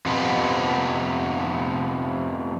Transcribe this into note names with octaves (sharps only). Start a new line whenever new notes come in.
F2 C3 B3